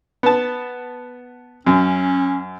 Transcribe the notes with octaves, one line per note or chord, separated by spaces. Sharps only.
B3 A5
F#2 C#4